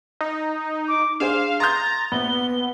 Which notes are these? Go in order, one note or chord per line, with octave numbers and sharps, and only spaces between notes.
D#4
D6
D4 G#4 C5 F5 E7
A#5 C6 D#6 G6 A6
A#1 B3 G7